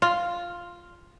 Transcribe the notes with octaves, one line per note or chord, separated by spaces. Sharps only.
F4